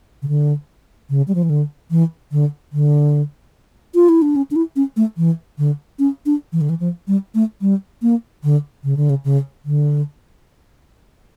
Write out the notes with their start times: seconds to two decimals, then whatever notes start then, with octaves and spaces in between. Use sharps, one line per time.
0.22 C#3
0.28 D3
1.10 C#3
1.28 G3
1.35 F3
1.43 E3
1.50 D3
1.91 E3
2.32 D3
2.73 D3
3.95 F4
4.09 E4
4.22 D4
4.36 C#4
4.51 D4
4.56 E4
4.76 C#4
4.96 A3
5.17 E3
5.58 D3
5.99 C#4
6.26 D4
6.52 E3
6.61 D3
6.69 E3
6.80 F3
7.07 G3
7.35 A3
7.61 G3
8.02 A#3
8.44 D3
8.84 C#3
8.97 D3
9.10 C#3
9.25 C#3
9.65 D3